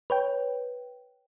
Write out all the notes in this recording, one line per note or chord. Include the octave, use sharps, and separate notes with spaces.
B4 C#5 G5